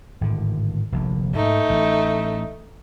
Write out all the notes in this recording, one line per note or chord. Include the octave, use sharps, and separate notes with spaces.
G#1 A2 D3
F1 A#1 D3
G#2 A3 D#4
A1